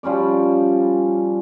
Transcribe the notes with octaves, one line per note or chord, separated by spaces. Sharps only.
F3 G3 C#4 D5